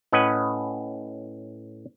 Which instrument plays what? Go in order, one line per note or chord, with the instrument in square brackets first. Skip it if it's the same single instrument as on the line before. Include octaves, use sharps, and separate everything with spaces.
[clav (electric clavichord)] A2 C#4 B4 D#5 F#5 G#5